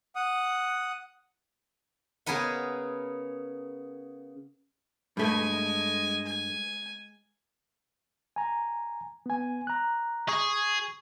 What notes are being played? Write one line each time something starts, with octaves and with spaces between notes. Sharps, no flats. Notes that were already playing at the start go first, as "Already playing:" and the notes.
F#5 D#6
C#3 B3 G#4 A#4 B4 F#5
G2 G#3 A3 G#5
G#5
G#5 A#5
B3 G#5
A#5 F#6
G#4 C#6